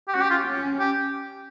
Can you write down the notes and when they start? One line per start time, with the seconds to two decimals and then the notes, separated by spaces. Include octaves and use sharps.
0.08 G4
0.14 C#4 F#4
0.22 G4
0.31 F4
0.46 C#4
0.79 G4